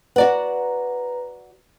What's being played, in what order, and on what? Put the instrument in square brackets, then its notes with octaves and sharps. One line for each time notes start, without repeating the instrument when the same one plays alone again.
[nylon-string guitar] F#4 D5 F#5 [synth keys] B4 A#5